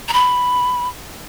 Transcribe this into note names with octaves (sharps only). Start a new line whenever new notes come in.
A#5
B5